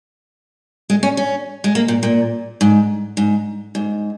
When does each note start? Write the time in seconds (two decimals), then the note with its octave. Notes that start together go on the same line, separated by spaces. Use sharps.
0.90 G#3
1.03 C#4
1.17 C#4
1.64 G#3
1.75 A#3
1.88 A#2
2.03 A#2
2.61 G#2
3.17 G#2
3.75 G#2